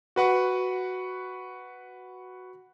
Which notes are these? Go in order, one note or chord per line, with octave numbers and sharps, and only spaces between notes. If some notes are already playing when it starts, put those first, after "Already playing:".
F#4 B4 F#5 C#6